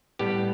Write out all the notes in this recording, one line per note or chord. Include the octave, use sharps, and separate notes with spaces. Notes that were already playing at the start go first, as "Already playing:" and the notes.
A2 G3 B3 G4